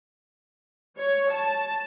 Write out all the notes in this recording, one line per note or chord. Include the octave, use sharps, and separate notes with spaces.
C#5
A5